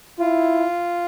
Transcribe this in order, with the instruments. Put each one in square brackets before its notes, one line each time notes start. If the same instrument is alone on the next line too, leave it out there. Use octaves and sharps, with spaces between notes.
[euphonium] E4 [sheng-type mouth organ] F4